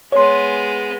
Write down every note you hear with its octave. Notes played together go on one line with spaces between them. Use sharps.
G#3 B3 C#5 C6